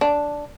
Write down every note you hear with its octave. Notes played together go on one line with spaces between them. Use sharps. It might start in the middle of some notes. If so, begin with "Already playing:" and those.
D4